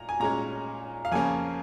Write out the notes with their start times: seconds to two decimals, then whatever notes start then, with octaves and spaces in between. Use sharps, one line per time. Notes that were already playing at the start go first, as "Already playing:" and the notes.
Already playing: A#2 A#5
0.09 G#5
0.20 A#2 G#3 C#4 A#5
1.05 F5
1.12 F2 C#3 A#3 C#4 G#5